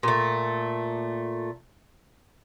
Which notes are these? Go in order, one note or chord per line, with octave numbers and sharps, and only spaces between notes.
A#2 A3